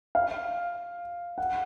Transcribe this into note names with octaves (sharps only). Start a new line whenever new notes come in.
F5
F#5